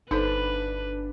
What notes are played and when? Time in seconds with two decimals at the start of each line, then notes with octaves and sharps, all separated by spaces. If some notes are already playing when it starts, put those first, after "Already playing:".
0.11 G1 D4 D#4 A4 B4 C5 B5